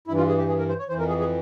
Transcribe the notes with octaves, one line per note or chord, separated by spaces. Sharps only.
G2 E3 E4
F4
G#4
G4
G#4
A#4
C5
C#5
F2 E3 C5
A#4
G#4
G#4